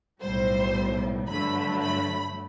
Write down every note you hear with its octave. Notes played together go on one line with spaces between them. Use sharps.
B1 A2 G3 C5
G2 D3 F#3 A3 B5
B5